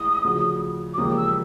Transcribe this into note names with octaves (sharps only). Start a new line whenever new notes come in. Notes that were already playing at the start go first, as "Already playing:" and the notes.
Already playing: A1 A2 E3 G#3 D#6
D2 C#3 F3
D6
E1 D#2 C#3 F3 A#3 D#6
E6